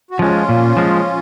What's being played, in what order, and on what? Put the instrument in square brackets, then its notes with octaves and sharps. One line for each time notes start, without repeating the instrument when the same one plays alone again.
[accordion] F#4
[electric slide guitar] F3 G#3 [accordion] C#4 F4
[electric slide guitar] A#2
F3 G#3